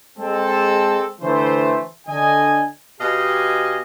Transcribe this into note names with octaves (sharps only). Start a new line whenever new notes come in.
G#3 C4 A4
D3 E3 A3 C5
D3 D#5 G#5
B2 G4 D#5 F5 G#5